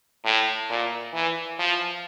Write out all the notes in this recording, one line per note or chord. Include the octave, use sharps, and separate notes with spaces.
A2
A#2
E3
F3